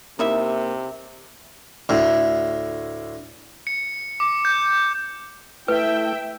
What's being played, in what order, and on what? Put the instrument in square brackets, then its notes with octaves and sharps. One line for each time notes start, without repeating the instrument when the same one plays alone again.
[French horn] C3 [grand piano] A#3 [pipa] D#4 E4 E5
[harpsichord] D2 A2
[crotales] C#7
D6
G6
[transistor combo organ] A3 [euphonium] E4 [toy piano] B4 [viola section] E5 G5